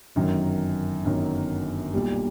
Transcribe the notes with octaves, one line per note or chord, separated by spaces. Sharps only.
G1 F#2 D#3 F#3
G1 F#2 D#3 F#3
B1 A#2 G3